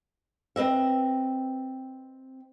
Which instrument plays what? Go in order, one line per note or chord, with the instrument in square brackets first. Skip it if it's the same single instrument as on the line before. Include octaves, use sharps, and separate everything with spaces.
[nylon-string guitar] C4 B4 D#5 E5